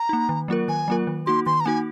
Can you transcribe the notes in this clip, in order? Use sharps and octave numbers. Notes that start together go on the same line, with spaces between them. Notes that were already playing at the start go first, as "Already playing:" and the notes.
Already playing: A#5
A#3 D#4
D#3
F#3 A#3 F4 A#4
D#3 G#5
F#3 A#3 F4 A#4
D#3
A#3 D#4 F#4 C6
D#3 C6
A#5
A#3 D#4 F#4 G#5